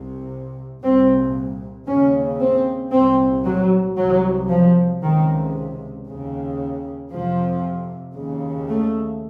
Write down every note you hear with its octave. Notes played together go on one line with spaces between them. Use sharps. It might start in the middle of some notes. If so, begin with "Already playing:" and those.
Already playing: C2 C3
C2 A#2 C4
D#2 C#3 C#4
C4
C2 A#2 C4
F#3
C2 C3 F#3
F3
C#2 C3 D#3
D#2 C#3
F2 C3 F3
D#2 C#3
A3